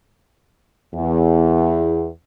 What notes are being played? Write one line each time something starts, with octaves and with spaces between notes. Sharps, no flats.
E2